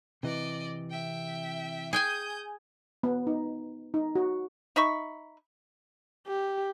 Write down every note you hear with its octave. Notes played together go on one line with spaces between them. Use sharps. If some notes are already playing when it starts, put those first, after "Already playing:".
C3 E3 D5 D#5
E5 G5
G#4 G5 G#5 D#6 G6
B3
D#4
D#4
F#4
D#4 E5 B5 C#6
G4